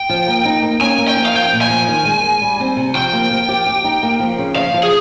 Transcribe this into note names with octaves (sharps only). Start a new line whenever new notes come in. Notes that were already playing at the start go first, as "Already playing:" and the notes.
Already playing: G5
F3
A#3
D#4
A#3
C#4 G#5
A#3
G5
F3
F5
F3 G5
A#2
G#5
F3
D#3
G#3
G#3
G3
C4
C3
F3 G5
A#3
F3
G4
G4
D#4
A#3
F3
C#3
F3 F5
F3
G#4